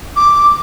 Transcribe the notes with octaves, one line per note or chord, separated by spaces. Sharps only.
D6